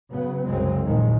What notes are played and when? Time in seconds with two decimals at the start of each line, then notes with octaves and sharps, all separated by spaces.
0.11 C#3 F#3 B3
0.46 C2 F#2 C#3 F#3 G#3 C4
0.84 A#1 E2 D#3 G#3